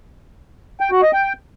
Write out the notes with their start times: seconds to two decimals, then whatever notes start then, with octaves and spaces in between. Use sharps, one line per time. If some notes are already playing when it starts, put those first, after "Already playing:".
0.80 G5
0.91 F#4
1.02 D#5
1.13 G5